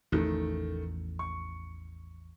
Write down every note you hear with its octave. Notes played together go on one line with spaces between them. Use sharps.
A1 E2 D#3 F3 A3
C#6